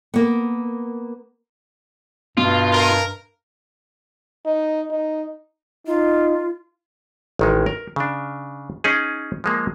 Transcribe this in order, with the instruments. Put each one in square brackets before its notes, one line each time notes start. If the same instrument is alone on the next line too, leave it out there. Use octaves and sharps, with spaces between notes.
[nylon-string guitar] A#3 B3
[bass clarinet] G2 [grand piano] B2 [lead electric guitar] F4
[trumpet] A#4
[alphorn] D#4
D#4
[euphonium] D#4 [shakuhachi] F4
[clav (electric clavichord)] A1 D#3 G#3
A#4
C#3 D4
C#4 D#4 G#4
F3 G#3 A#3